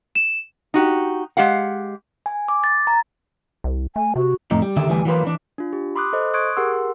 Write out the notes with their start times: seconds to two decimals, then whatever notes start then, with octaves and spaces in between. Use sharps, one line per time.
0.15 E7
0.74 D#4 F#4 G4
1.37 G#3 G4 F5 F#5
2.26 G#5
2.48 D6
2.64 A6
2.87 A#5
3.64 C2
3.96 A3 G#5
4.16 C3 F#4
4.51 F2 A2 D#4
4.62 G3
4.76 D#2 D3 D#3 G4 E5
4.88 D2 E3 G3 G#5
5.05 E3 F#3 A#3 G4 B4 C5
5.23 E3 D4
5.58 D4 F4
5.73 G4
5.95 B5 C6 D6 D#6 F#6
6.13 A4 C5 D#5
6.34 C6 C#6 D#6 F#6 G#6 D7
6.56 G4 G#4 A#4 F#5 C6 E6